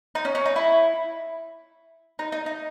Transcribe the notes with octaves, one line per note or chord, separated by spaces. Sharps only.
D#4
C#4
C#4
D#4
E4
D#4
D#4
D#4